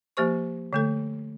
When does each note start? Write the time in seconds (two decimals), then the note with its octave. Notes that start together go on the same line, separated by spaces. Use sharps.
0.17 F3 A#3 G4 C5 C#6
0.73 D3 A3 A4